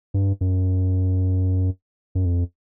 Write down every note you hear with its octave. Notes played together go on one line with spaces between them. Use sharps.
G2
F#2
F#2
F2